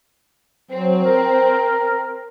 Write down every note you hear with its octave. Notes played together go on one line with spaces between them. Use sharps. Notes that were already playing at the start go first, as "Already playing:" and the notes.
F#3 C4
A#4